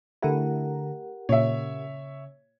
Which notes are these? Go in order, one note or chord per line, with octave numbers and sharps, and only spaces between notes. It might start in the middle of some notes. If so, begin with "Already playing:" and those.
D3 A3 E4 G4 A#4 F#5 A#5
A#2 C#3 C#5 E5